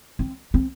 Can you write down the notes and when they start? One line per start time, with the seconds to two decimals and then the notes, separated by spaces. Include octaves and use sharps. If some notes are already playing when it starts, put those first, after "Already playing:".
0.19 C4
0.54 C4